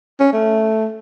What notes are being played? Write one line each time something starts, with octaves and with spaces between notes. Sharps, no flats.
C#4
A3